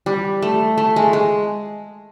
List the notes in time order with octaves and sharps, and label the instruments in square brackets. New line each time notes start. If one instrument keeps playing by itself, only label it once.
[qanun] G3
A3
A3
G#3
G#3